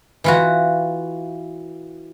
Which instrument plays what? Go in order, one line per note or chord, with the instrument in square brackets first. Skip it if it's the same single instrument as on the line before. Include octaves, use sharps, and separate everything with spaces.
[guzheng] E3 F4 F#4